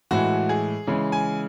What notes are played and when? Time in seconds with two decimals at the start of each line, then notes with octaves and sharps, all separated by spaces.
0.11 A2 E3 G#3 F#4
0.49 G#4
0.87 C#3 E3 G#3
1.12 G#5